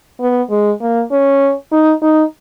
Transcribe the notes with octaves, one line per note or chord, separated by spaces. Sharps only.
B3
G#3
A#3
C#4
D#4
D#4